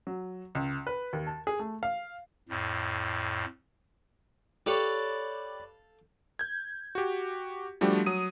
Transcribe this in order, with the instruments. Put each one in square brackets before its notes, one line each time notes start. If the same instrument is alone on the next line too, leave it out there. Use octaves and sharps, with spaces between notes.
[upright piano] F#3
C#2
B4
D#2
A5
G#4
A3
F5
[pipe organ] F2 A2
[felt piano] G4 [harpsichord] A4 F5 [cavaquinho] B4 C#5 D5
[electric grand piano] G6 G#6
F#4 G4
F3 G3 A3 D4 F#4 G4
F#3 D#6 D#7